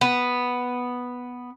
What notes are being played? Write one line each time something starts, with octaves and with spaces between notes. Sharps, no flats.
B3